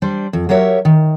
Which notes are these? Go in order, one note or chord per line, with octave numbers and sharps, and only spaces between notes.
G3 D4 C5
F2
F#3 G4 A#4 C#5 E5
D#3